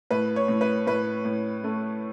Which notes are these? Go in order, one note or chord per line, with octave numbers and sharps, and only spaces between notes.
A2 B4
C#5
A2
B4
A2 B4
A2
A3